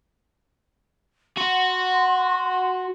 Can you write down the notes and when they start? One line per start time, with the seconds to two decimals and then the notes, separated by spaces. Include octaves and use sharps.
1.38 F#4 C6